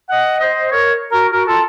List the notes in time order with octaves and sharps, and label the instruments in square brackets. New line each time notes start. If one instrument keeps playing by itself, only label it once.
[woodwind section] D#5 F#5
C5 D#5
A#4 C#5
F#4 A#4
F#4 A#4
F4 A4